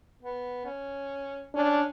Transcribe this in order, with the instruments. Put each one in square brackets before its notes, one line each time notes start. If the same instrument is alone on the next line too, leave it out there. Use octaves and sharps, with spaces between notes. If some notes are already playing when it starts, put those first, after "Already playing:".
[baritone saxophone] B3
C#4
[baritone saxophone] C#4 [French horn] D4